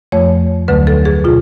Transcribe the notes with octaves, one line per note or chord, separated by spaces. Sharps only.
F2 F3 A3 C#5
D2 D3 F#3 A3 B4
A4
G#4
B2 F4